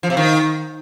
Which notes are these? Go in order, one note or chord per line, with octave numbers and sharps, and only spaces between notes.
F3
C3
D#3